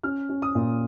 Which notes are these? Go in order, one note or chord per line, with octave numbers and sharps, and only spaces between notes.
C#4 F6
C#4
D#6
A#2